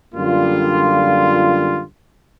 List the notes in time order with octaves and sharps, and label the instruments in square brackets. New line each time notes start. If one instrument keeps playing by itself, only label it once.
[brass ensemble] F#2 D3 G3 A#3 F4